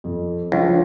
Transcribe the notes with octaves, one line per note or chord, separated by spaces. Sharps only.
F2
C#2 F3 D4